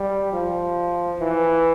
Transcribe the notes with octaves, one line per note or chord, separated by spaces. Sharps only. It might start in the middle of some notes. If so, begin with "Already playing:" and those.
Already playing: G3
F3
E3